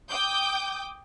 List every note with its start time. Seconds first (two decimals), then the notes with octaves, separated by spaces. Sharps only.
0.10 G5 D6 D#6 G6